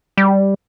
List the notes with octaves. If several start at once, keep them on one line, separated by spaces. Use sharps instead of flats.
G3